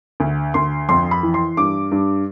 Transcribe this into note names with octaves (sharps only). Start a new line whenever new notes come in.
D2
D2 C6
F2 C6
B5
E3
C6
G2 D6
G2